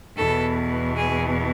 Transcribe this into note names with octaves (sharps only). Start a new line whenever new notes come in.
E2 B2 A4
G#4